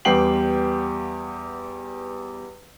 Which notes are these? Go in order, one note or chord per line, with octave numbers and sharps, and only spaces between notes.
E2 G3 B3 G5 C7 F#7